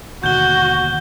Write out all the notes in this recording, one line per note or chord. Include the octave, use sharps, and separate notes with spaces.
D#2 B2 D3 F#4 G6 G7